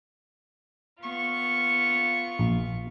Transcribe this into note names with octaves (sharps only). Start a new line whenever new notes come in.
B3 F4 C#6
A#1